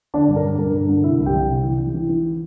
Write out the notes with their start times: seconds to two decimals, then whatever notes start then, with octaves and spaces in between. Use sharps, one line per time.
0.14 D3 D4 D5
0.28 G2
0.36 A#4
0.44 G2
0.59 G2 A#4
0.73 G2
0.89 D3
1.04 C3 E4 E5
1.19 C2
1.26 G4 G5
1.34 C2
1.49 C3
1.64 E3
1.79 E3
1.94 E3
2.09 E3